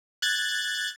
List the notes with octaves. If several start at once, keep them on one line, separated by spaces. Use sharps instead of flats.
F#6 G#6 A6